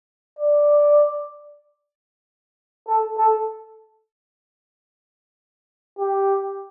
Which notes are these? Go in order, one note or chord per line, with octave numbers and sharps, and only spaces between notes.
D5
A4
A4
G4